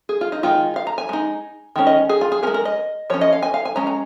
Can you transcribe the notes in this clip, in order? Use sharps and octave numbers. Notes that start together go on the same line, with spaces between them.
G#4
F4
D#4
D#3 G#3 D#4 F4
F5
A#5
G#5
G#3 D#4
D#3 G#3 C#4
D#5
G#4
F4
G#4
C#4 A#4
G#3
A#4
D#5
F3 C#4 C#5
D#5
F5
G#5
F5
G#5
G#3 C#4 A#5
A#5